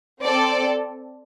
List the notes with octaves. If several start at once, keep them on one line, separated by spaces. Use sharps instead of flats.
C4 A4 D5